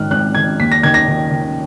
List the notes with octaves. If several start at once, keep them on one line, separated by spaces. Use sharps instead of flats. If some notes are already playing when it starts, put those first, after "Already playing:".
Already playing: G#2 D#3 F6 F#6
G#1 F#6
D#3 G#6
D#2 B6
A#6
D#3 G#6
A#6
D#3
D#3